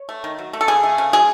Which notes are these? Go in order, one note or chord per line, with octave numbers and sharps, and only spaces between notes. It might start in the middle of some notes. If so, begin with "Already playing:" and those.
Already playing: C#5
A3
D#3
F#3
A3
A4
C#3 G#4
A3
C#3
F#3 G#4